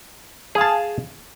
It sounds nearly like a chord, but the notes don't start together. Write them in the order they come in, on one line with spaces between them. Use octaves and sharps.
G#4 F5 A5